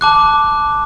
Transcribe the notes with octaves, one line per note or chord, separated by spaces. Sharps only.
A5 D6 F#6